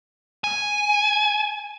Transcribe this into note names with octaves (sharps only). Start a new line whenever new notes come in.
G#5